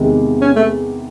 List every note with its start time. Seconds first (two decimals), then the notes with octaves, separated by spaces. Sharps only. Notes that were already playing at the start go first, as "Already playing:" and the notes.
Already playing: E2 C3 D#3 G#3
0.41 C#4
0.56 A3